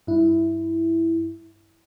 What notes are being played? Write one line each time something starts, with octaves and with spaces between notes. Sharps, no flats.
G2 E4